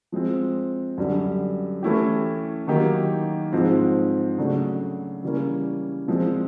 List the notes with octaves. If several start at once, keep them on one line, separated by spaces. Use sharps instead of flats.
F3 G#3 C4
F#2 D3 G3
E3 A3 C#4 E4 G4
D#3 F#3 A#3 D#4 G4
G#2 F3 G#3 C4
C#3 F#3 A3 D4
C#3 E3 G3 A#3 C#4
A#2 F3 G#3 C4 F4